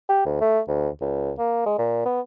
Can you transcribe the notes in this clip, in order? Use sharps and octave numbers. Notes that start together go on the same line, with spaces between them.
G4
D2
A3
D2
C#2
A#3
G#3
A#2
B3